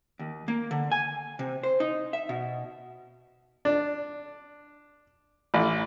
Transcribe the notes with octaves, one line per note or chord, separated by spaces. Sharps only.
D#2
A#3
D3
G#5
C3
C5
D#4
E5
B2
D4
A1